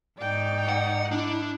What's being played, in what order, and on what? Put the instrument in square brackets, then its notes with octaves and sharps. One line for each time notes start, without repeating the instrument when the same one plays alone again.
[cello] G#2 D#4 [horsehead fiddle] D5 G5
[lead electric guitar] F#5
[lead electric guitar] D4 [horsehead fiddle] E4